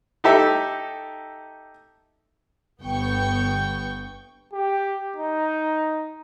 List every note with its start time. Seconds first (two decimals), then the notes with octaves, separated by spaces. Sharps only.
0.24 D#4 G4 A4 E5
2.81 G1 B3 G5 C#6
4.53 G4
5.17 D#4